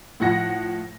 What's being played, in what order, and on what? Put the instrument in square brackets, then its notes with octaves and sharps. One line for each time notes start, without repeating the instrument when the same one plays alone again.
[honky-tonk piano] A2 F3 F#5 A#6